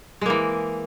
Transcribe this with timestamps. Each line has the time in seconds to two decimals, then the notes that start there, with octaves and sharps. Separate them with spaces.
0.21 G#3
0.26 A#3
0.30 E3